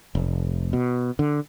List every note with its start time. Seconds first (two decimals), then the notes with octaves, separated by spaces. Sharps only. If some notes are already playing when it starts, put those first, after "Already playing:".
0.15 F1
0.73 B2
1.19 D3